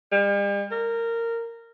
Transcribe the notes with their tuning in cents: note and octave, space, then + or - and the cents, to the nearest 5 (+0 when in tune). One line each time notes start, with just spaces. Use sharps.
G3 +45
A#4 -15